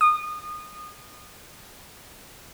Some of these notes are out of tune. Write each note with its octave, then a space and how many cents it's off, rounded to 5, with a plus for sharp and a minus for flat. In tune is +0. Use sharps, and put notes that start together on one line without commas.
D#6 -25